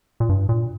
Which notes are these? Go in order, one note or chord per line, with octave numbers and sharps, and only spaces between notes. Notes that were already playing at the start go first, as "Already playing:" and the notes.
A#2
G2
A#2